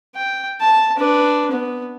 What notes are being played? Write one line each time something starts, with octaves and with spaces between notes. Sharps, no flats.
G5
A5
D4 B4
B3